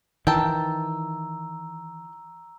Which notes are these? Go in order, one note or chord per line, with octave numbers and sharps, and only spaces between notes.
D#3 E3 G5 A5 A#5 E6